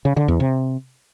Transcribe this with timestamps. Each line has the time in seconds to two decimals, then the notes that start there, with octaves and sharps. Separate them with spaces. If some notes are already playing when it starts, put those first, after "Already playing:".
0.05 C#3
0.17 D3
0.28 E2
0.40 C3